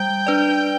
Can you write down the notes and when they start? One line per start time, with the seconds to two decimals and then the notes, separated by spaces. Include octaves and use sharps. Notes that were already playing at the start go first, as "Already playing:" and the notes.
Already playing: G3 G5
0.27 D4 B4 D5